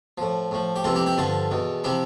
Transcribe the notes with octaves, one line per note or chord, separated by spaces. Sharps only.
A2 F3
A2 F3
G4
F2 C3 E3 F4 A4
E4 G4
E4 G4
G2 D3 F3 F4 A4
E2 B2
C3 F3 E4 G4